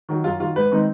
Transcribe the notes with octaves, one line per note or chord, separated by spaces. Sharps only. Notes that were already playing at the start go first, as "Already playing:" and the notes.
D#3 F#3
F#2 F4
D#3 F#3 F4
G#2 B4
D#3 G#3 C4 D#4